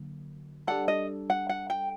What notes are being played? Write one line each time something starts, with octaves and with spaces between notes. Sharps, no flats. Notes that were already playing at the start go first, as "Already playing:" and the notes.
Already playing: D3 F#3 A#3
G3 D4 A4 F#5
D#5
F#5
F#5
G5